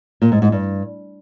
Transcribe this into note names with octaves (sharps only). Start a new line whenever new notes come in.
A#2
G#2
G#2
G2